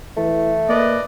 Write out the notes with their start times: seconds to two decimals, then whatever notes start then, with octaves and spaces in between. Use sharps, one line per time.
0.17 E3 A3
0.68 A#3 B4 D5 D#5